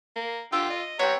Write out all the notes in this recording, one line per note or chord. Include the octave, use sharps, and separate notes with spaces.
A#3
D3 F4 G5 D6 E6
D#5
B3 C4 G4 C#5 F#5 G5 A#5